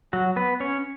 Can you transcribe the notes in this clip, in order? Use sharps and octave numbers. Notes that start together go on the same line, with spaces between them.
F#3 F#4
B3 B4
C#4 C#5